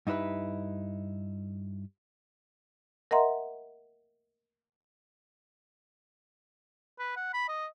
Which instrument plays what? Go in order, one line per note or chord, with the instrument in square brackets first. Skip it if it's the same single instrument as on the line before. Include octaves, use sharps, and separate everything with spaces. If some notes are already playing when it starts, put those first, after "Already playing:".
[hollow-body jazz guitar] G2 D#4 E4 B4 E5
[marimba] A#4 D#5 E5 F#5 A#5 C6
[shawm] B4
F#5
B5
D#5